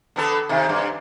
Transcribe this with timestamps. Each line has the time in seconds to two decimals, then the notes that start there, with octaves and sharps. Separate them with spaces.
0.16 D3 B3 A4
0.49 C3 D#3
0.69 G2